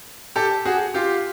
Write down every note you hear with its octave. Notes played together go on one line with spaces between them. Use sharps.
G4 A4
F#4 G#4
F4 G4